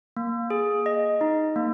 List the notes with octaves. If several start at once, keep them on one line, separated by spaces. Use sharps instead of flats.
A#3
G#4
D#5
D#4
A#3